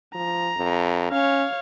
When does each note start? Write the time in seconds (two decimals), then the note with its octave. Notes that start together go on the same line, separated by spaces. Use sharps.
0.15 F3 A#5
0.57 F2
1.11 C#4 C#5 F5